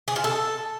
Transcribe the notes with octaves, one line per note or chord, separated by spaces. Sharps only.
G#4
F4
A4